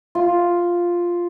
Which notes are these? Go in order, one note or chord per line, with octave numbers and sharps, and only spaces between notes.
F4